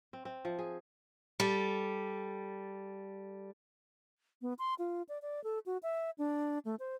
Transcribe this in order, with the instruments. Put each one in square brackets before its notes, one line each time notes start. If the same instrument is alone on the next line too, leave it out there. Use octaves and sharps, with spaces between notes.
[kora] C4
C4
F3
G#4
[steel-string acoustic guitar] G3 A4
[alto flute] B3
C6
F4
D5
D5
A4
F#4
E5
D4
A3
C5